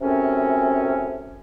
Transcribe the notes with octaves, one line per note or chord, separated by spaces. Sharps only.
F#2 A2 C3 C4 C#4